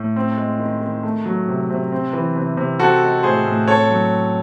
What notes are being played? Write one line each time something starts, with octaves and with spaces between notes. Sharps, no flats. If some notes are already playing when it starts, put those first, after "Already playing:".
Already playing: A2
C4
G#3
D#3
D#3
A3
F#3
C3
C3
C4
E3
C3
C3
C4 F#4 A4
G#3
A2 G#4 C5
A2
C4 A4 C#5
F#3